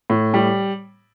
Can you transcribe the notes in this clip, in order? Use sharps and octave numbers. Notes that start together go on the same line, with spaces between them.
A2
G3